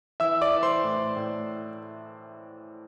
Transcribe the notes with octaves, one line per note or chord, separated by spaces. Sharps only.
E3 E5 E6
D5 D6
E3
C5 C6
A2
A2